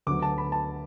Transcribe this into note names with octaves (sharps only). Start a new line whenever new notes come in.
D2 D3 F#3 B3 D6
A5
B5
A5